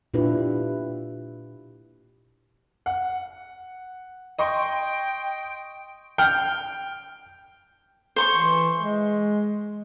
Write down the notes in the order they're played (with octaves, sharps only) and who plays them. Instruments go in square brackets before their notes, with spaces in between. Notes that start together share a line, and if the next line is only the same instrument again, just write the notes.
[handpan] A#2 D4 E4 F4 G4 B4
[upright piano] F#5
[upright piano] D#5 C6 C#6 [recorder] G5
[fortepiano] G5 F6
[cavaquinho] C5 C6 C#6
[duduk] E3
G#3